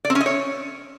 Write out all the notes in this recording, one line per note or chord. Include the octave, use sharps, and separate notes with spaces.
D5
C4
C#4
D#5
C#5